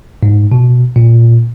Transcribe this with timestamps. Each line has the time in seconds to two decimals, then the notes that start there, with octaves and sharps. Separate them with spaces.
0.23 G#2
0.52 B2
0.96 A#2